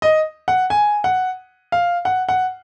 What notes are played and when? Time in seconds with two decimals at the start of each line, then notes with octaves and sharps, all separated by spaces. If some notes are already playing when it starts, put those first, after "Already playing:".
0.02 D#5
0.48 F#5
0.70 G#5
1.04 F#5
1.72 F5
2.05 F#5
2.29 F#5